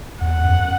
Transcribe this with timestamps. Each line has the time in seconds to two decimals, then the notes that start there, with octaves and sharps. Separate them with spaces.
0.21 E2 F#5
0.44 F#2